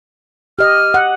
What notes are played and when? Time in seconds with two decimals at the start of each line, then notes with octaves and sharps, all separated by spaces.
0.59 G4 D#5 F6
0.94 F#5